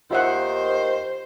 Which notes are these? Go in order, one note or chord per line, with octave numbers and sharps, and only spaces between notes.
D#2 D#3 F4 C5 E5 F#5